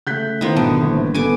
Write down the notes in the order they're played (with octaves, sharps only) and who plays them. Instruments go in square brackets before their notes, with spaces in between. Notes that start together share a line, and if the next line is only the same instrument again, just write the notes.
[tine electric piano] C#3 A3 [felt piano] F#6 G6 B6
[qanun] D#3 B3 [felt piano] E4 F4 C5
[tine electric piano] G#1 G3 [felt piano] B2 [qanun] D3
[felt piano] A#1 A2 B4
[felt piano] B3 A4 B4 [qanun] G#5 D6